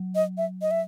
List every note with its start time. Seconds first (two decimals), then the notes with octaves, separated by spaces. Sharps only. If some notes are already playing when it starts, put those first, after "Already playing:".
Already playing: F#3
0.15 D#5
0.38 E5
0.62 D#5
0.71 E5